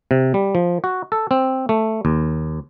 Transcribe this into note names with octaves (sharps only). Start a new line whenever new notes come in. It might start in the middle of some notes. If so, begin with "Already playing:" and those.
C3
G3
F3
F#4
A4
C4
A3
D#2